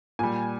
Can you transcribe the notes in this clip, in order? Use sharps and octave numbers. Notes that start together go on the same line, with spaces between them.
A#2 G3 G#5